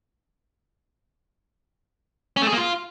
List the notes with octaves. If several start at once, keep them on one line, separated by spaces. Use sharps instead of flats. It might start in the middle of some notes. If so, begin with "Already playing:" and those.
C#4
A3
G#4
A#3
F4